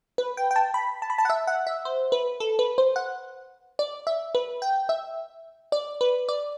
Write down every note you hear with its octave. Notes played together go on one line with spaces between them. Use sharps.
B4
G5
G5
A5
B5
A5
B5
A5
F#5
E5
F#5
E5
C5
B4
A4
B4
C5
F#5
D5
E5
B4
G5
E5
D5
B4
D5